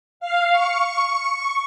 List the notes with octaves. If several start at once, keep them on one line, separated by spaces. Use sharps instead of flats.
F5
C#6